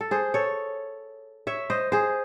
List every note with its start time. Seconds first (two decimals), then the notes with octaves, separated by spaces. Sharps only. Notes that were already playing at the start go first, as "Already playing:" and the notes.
0.01 A4
0.11 G#4 C5
0.34 A4 C#5
1.47 C#5 E5
1.70 C5 D#5
1.92 G#4 C5